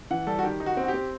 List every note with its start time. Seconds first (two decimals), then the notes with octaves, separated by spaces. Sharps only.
0.11 E3 F#5
0.27 G3 A4
0.39 F#4
0.43 D#3 G4
0.60 D#4
0.66 F#4
0.77 C4
0.84 F#4
0.88 G4
0.94 C4